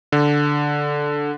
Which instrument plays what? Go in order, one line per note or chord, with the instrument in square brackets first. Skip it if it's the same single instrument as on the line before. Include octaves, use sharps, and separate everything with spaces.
[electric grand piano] D3